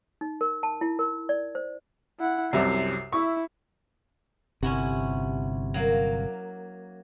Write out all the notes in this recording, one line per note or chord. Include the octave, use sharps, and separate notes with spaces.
D#4
A#4
A5
E4
A#4
D5
C5
E4 F#5
C2 F#2 C3 C7
E4 E5 C#6
G1 C3 C#4 E4 F#4
F#3 A#3